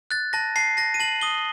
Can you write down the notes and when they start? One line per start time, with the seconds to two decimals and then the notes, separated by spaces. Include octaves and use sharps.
0.11 F#6 A6
0.33 A5 A#6
0.56 A5 C7
0.77 A5 A#6
0.94 D#7
1.00 A5 F#7
1.21 D#6 G7